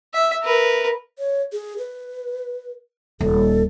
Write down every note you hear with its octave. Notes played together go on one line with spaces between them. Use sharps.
E5
A#4 B4
C#5
G#4
B4
D#1 A4